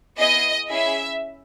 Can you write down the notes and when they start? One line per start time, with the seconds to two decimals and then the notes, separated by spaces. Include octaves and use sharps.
0.18 B3 E4 G#4 D#5
0.69 C#4 E4 G#4 E5